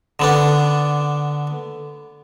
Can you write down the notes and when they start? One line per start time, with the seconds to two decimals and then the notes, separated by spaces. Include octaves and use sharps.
0.19 D3 B3 D4